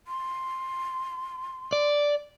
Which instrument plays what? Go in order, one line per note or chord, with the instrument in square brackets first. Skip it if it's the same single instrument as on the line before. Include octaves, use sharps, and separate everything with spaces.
[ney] C6
[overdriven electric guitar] D5